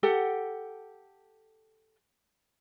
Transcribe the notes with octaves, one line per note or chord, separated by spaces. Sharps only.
G4 A4 F#5